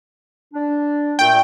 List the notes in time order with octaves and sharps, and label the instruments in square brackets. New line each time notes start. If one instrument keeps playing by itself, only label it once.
[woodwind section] D4
[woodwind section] A#2 A3 [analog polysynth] G5